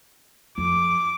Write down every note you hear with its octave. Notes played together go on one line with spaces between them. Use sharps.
F2 D6